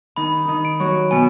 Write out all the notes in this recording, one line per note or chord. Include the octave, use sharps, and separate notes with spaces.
D#3 D#4 B5
D#3 D#4
D7
F#3 F#4
B2 B3 G#5